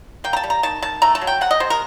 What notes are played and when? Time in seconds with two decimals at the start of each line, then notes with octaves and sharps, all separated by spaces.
0.24 A#3 G5
0.33 A#5
0.37 A5
0.44 G3
0.50 A#5
0.63 D#3 A5
0.82 D#3 A5
1.02 A3 A#5
1.15 A5
1.21 F#3
1.27 G5
1.41 C3 F#5
1.51 D#5
1.60 C3 C5
1.70 A#4